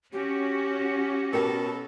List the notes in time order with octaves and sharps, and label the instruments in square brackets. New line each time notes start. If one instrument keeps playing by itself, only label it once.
[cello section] C#4 F#4 [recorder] G4
[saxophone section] B2 A4 [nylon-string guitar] A#4 G5 A5